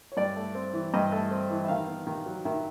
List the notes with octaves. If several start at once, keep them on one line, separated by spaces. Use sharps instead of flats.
C#5
G2 D5
A3
C4
E3
G2 D#5
A3
C4
E3
E5
D#3 F5
B3
D#3
F#3
D#3 E5